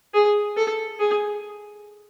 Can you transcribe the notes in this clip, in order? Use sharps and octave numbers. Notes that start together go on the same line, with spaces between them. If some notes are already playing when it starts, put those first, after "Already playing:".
G#4
A4
G#4